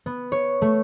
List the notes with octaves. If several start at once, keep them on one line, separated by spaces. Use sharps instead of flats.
B3
C#5
A3